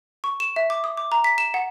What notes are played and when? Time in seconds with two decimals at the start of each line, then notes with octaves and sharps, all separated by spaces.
0.24 C#6
0.40 E7
0.56 E5
0.70 D6
0.84 D#6
0.97 D6
1.12 A#5
1.24 B6
1.38 E7
1.54 F#5